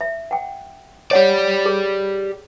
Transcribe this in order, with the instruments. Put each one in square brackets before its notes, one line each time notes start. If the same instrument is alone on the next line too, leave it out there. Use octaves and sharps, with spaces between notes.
[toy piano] E5
F#5 G5
[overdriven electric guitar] G4 D5 [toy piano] C#5 F#5
[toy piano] G#4